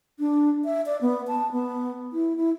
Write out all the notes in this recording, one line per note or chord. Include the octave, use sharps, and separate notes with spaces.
D4
E5
D5
B3
A5
B3
E4
E4